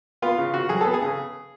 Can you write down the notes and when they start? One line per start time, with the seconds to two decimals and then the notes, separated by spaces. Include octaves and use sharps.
0.22 B3 F4
0.38 C#3
0.54 C#3 F#4
0.69 F#3 G#4
0.81 B3 A4
0.94 G#4
1.01 C#3